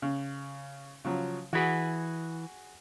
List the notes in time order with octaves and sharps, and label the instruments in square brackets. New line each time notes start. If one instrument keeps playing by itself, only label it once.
[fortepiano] C#3
C#3 F3 F#3
[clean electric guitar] E3 B4 [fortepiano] F#4 G#4 F#5